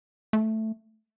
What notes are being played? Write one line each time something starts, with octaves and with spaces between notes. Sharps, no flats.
A3